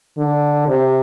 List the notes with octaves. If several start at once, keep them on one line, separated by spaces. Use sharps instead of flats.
D3
C3